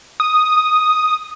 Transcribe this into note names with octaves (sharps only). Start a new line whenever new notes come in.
D#6